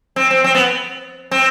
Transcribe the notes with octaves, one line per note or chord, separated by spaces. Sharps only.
C4
C4
C4
B3
C4